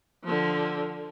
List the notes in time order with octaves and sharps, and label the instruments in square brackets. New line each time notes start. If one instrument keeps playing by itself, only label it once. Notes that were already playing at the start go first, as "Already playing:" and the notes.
[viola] D3 F3